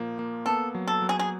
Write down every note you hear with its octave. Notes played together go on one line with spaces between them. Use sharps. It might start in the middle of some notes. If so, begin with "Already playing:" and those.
Already playing: A#2 F3 A#3
A#3
B3 A4
F#3
A4
F#3
G#4
G#4